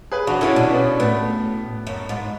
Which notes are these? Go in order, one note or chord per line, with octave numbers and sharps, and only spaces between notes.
G#4 B4
E3 D4 F#4
D3 C#4 E4
B2 D4
C#4
B3 D4
A2 B3
F#2
G#2